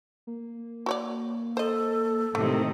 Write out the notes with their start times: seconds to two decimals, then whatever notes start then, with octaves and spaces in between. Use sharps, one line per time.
0.27 A#3
0.86 F#4 C#5 D5
1.57 A4 C5 D#5
2.35 A2 C3 D#3 A3 D#6